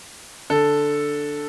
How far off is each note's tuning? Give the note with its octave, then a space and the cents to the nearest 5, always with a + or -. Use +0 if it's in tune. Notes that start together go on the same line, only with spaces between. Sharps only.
D3 +0 A4 +0